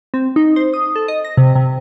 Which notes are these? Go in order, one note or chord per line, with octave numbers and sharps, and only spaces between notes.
C4
D#4
C5
D#6
A4
D#5
A#6
C3
C3